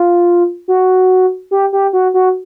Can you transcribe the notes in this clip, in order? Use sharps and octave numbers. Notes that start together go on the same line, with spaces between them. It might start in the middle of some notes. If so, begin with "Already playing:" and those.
Already playing: F4
F#4
G4
G4
F#4
F#4